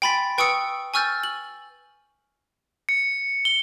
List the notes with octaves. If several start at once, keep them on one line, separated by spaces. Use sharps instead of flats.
G5 G#5 B5 C6 A6 B6
B4 G5 C#6 D#6 E6 C#7
G#5 C#6 E6 F6 G6 A6
F#7
C#7
G7